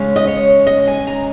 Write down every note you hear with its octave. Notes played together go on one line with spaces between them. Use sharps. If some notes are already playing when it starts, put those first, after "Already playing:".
Already playing: C#3 G#3 C#4
D#5
C#5
D#5
G#5
A#5